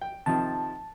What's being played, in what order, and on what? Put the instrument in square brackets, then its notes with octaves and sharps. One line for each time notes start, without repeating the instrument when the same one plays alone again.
[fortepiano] G5
[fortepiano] C3 D#3 F3 [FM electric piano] A5